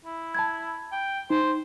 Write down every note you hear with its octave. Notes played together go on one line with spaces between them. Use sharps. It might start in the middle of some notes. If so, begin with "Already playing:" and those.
E4
A5 B5 G#6
G5
D#4 C5